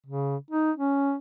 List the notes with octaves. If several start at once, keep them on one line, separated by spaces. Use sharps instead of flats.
C#3
D#4
C#4